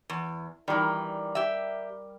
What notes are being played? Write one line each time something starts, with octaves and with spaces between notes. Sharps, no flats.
E2
D#3 E3 G3 A#4
G4 E5